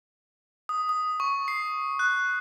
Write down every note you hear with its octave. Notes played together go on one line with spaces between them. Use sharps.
D#6
D#6
C#6
C7
F#6